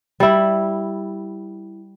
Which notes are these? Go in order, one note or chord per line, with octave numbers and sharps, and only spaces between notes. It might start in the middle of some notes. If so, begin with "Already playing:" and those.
G3 E4